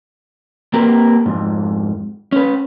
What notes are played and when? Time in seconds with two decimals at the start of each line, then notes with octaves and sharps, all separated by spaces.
0.74 A#3 C4 G4 A#4 B4
1.26 F2 G#2
2.32 C#4 B4